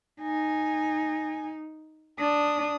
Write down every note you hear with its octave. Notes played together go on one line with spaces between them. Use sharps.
D#4 G#5
D4 D#6